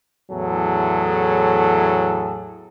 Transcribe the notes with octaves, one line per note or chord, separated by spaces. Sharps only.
E2 A2 F#3 G#4 A4